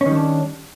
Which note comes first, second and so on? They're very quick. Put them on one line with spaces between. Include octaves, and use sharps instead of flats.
C#4 D#3 G3 D4